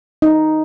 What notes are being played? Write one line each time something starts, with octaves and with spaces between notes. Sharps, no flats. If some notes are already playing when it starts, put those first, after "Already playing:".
D#4